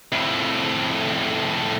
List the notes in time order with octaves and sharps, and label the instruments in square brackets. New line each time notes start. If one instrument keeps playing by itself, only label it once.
[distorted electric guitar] F2 A2